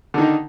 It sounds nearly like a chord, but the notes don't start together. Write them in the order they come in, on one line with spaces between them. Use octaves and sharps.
D3 D#3 D#4